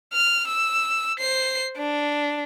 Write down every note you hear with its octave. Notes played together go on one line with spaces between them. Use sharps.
F6
E6
C5 C7
D4